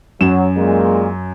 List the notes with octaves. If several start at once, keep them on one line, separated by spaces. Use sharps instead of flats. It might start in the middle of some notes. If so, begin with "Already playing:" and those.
F#2 F#3 E7
A#2 G#3